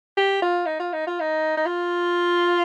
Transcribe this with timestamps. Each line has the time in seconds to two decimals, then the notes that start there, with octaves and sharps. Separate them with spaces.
0.17 G4
0.42 F4
0.66 D#4
0.80 F4
0.93 D#4
1.07 F4
1.20 D#4
1.57 D#4
1.65 F4